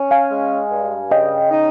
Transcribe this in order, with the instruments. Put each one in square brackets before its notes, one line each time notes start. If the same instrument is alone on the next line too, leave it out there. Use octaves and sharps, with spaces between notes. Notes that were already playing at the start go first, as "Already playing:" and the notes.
Already playing: [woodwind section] C#4
[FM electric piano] F5 G#5
[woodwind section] G#3
G2
[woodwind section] C#3 [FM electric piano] D#5 G5
[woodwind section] D#4